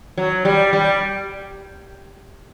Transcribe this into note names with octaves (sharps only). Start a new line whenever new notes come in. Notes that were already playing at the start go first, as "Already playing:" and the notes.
F#3
G3
G3